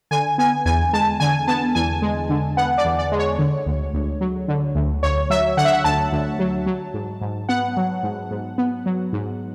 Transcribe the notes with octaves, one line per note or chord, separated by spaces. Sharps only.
D3 G#5
B3 G#5
E2 G#5
G#3 A5
D3 G#5
B3 A5
E2 G#5
G#3
D3
B3 F#5
D5
E2
D5
G#3
C#5
D3
D2
D2
F#3
D3
D2
D2 C#5
F#3 E5
D3 F#5
E5
F#5
D2 A5
D2
F#3
F#3
G#2
G#2
B3 F#5
F#3
G#2
G#2
B3
F#3
G#2